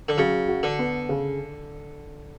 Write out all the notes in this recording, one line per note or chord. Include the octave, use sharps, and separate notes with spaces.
D3
C#3 F#3
F#4
D3
B3
C#3